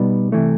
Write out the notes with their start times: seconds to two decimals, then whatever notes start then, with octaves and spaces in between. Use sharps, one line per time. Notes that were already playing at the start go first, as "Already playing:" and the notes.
Already playing: B2 G3 B3 D#4 D5
0.32 C3 E3 A3